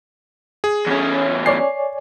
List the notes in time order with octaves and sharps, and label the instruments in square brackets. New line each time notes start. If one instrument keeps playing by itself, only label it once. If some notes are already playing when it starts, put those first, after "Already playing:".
[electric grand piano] G#4
[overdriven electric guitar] E2 C#4
[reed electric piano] C#5 D5 G#5 [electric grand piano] C7